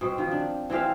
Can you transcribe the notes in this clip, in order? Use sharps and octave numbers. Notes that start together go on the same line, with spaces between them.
B2 C4
D#3 F3
D4
E3 C4 G4 F5